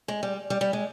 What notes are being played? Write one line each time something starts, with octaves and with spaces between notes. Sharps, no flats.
G#3
G3
G3
G3
G#3